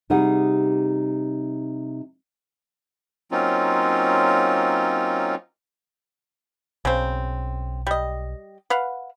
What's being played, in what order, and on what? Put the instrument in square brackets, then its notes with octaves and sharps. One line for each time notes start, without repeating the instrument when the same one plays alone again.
[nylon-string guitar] C3 G3 D#4 G#4 F#5
[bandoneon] F#3 A#3 C4 C#4 D#4 F4
[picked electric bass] B1 [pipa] C#3 C4
[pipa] G3 D#5
B4 F5 F#5